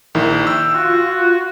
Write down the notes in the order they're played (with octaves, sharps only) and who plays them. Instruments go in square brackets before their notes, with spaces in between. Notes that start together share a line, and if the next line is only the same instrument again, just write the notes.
[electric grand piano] A#1 D#3 E4
[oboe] G5 [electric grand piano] E6
[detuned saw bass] F4 [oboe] F#4